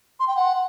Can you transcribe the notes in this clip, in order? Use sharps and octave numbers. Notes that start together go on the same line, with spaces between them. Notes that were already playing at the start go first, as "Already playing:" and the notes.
C6
G5
F#5